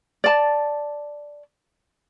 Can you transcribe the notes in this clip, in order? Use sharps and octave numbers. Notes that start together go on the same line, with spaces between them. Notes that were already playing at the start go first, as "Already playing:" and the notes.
D5 A5